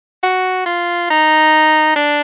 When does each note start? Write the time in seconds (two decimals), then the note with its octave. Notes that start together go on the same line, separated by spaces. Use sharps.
0.23 F#4
0.66 F4
1.10 D#4
1.96 D4